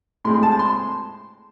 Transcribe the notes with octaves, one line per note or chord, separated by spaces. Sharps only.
A2 G#3 C4 C6
A5
C6